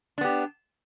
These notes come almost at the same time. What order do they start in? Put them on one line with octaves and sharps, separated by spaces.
D4 B3 G4